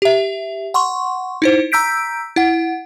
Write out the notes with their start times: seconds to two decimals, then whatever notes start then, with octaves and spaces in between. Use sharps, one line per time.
0.02 G4 E5
0.74 F#5 C6 C#6
1.42 D#4 E4 C5
1.72 A#5 E6 G6 B6 D7
2.36 E4 F#5